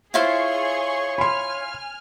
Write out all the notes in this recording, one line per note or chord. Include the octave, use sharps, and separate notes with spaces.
E4 F4 G#4 C5 C#5 C6 C#6
G#5 B5 C6 F6